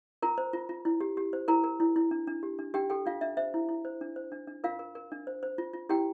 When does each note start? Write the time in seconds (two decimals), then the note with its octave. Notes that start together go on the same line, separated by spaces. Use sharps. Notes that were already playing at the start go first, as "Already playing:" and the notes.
0.22 F4 A#4 A#5
0.38 C5
0.53 F4
0.69 F4
0.85 E4
1.01 G4
1.17 G4
1.33 C5
1.48 E4 A#4 A#5
1.64 A#4
1.80 E4
1.96 E4
2.11 D4
2.27 D4
2.43 G4
2.59 D4
2.74 D4 G4 G5
2.90 G4 A4 G5
3.05 D4 F4 F5
3.21 D4 E5
3.37 C5 E5
3.54 E4
3.69 E4
3.85 C5
4.01 D4
4.16 C5
4.32 D4
4.47 D4
4.64 F4 A#4 F5
4.79 A#4
4.95 A#4
5.12 D4
5.27 C5
5.43 C5
5.58 F4
5.73 F4
5.89 E4 G4 G5